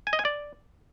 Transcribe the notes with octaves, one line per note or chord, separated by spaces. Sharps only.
G#5
D#5
G#5
D5